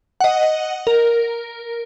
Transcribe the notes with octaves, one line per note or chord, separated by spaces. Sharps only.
D#5 F#5
A#4